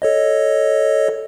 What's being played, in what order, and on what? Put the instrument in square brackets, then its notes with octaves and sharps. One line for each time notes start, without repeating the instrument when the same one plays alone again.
[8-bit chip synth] A4 C#5 D#5